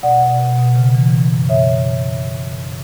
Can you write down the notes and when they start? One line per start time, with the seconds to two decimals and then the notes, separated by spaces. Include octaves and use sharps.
0.03 B2 D5 F#5
0.21 B2
0.40 B2
0.58 B2
0.76 C#3
0.95 E3
1.12 E3
1.31 F#2
1.49 B2 C#5 E5
1.68 B2